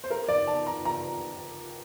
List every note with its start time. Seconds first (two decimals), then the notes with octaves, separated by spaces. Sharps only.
0.04 C5
0.10 A#4
0.29 D5
0.47 A5
0.67 A#5
0.85 A#5